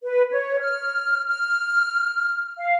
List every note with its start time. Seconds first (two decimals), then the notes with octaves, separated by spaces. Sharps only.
0.03 B4
0.31 C#5
0.61 F6
1.26 F6
2.58 F5